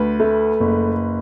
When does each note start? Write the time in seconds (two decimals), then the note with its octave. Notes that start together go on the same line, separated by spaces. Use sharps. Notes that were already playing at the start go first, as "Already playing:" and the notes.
Already playing: D2 B4
0.20 A3
0.60 F#1